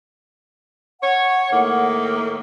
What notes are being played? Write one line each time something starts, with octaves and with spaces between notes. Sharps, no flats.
C#5 F#5
A2 D#3 A#3